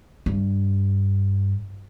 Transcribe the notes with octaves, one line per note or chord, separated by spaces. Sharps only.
G2